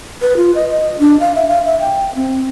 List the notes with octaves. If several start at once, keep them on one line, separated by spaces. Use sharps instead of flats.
B4
F4
D#5
D#5
D4
F5
E5
F5
E5
G5
C4